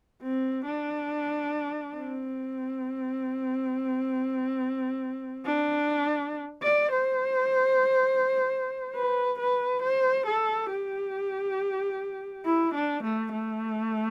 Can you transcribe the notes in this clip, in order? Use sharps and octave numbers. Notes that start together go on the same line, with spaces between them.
C4
D4
C4
D4
D5
C5
B4
B4
C5
A4
G4
E4
D4
A3
A3